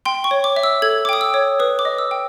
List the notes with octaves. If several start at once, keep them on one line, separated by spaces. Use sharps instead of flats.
G5 C6
C#6
C#5
D6
E5
E6
A4 G#6
D6
G5 D#6
E6
C#5
B4 D#6
D6
D#5
E6
G5